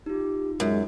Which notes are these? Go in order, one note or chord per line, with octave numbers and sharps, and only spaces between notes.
D#4 F4 G4
F#2 G#3